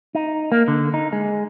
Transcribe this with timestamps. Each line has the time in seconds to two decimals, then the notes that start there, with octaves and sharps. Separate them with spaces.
0.15 D#4
0.52 A#3
0.68 D3
0.94 D#4
1.13 G#3